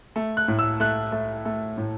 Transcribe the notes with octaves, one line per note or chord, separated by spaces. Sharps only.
A3
F#6
A2
E6
A3 F#6
A3
A3
A2